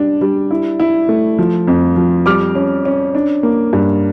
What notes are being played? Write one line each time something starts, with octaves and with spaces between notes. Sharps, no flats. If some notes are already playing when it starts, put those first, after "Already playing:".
Already playing: G3 D4
G3
E4
E4
A3
F3
F2
F3
G3 D6 F6
C#4
C#4
D4
A#3
G2